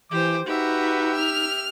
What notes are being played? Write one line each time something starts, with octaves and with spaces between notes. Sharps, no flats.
E3 G4 C5 D6
D#4 F#4 G4 B4 E5
F6